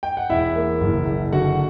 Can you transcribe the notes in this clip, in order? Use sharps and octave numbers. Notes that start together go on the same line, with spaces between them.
G5
F#5
E1 E4 E5
A#3
F#1
F#1
D3 F#4 F#5